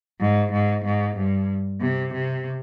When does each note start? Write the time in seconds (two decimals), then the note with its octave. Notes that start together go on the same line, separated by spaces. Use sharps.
0.20 G#2
0.52 G#2
0.85 G#2
1.16 G2
1.81 C3
2.13 C3